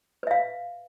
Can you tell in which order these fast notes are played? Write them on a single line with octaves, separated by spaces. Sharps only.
B4 E5 F5